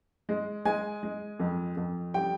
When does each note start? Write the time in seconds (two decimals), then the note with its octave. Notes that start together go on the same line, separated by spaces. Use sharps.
0.29 G#3
0.65 G#3 G#5
1.03 G#3
1.39 F2
1.77 F2
2.14 G3 G5